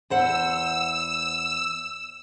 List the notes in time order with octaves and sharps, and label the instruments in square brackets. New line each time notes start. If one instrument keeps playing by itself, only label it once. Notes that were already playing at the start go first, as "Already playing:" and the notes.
[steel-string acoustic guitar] E2 C5 F#5 [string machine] E6